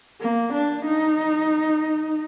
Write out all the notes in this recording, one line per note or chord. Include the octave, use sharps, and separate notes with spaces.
A#3
D4
D#4